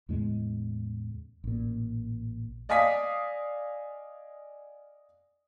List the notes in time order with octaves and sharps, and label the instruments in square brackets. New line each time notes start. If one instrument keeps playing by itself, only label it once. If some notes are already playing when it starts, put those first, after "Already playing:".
[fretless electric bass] E2 A2 C#3 G#3
A1 A#2
[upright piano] D5 D#5 F5 G#5 D#6 B6